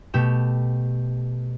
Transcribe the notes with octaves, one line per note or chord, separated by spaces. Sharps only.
B2 A3 G4 E7